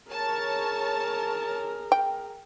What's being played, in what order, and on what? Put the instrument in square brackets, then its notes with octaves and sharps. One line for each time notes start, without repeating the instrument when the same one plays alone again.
[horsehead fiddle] G#4 A#4 [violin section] C#5 A5
[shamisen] G5